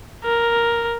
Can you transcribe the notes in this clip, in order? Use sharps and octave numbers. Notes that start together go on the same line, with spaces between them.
A#4